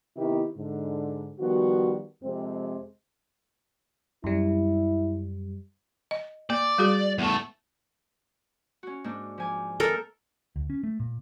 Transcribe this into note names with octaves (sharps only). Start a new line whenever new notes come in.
C3 D#3 B3 D#4 E4 G4
G#2 D3
D#3 F3 G3 B3 F#4
F2 C3 G#3 C4
F#2 G3 E4
D#5
A#3 D5
G3 F#4 G#4
E2 A3
C#4 F#4
G#2 A#3 D4
F3 G#5 D6
C4 A4 A#4 D#5
D2
C#4
A3
A#2